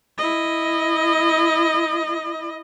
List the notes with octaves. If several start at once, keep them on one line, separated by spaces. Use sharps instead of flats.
E4 D#5